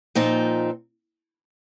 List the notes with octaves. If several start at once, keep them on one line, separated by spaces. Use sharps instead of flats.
A#2 F3 C4 D#4